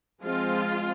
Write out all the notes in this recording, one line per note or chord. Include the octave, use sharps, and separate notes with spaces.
F3 G#3 C4 F4